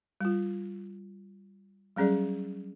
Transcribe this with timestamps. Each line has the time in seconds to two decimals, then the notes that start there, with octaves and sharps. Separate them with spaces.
0.21 G3 F4
1.96 F#3 G3 C#4 G#4 D5